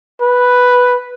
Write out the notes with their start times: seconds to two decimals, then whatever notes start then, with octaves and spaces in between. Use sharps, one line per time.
0.22 B4